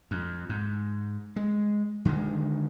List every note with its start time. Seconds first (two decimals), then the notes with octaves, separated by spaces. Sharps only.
0.11 F2
0.49 G#2
1.36 G#3
2.05 D3 D#3 G3 G#3